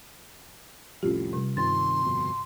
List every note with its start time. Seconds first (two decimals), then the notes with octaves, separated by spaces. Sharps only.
1.03 C2 F2 A2 C#4 F4 G4
1.33 C3 G3
1.57 G2 C3 D#3 C4 C6 A6
2.05 G1 F2 B2